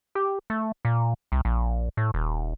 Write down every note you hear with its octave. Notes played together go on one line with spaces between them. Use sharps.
G4
A3
A#2
C2
A#1
A2
D#1